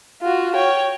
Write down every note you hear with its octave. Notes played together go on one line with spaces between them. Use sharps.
F4 F#4
C#5 G5